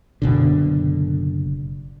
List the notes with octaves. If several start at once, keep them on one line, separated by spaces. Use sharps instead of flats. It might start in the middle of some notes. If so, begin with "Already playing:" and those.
F#1 B2 D3